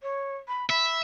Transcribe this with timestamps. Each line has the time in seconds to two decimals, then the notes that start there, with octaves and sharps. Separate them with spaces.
0.03 C#5
0.48 B5
0.70 E5 B5